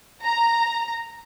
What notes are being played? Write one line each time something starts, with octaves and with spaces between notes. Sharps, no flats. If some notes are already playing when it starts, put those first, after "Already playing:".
A#5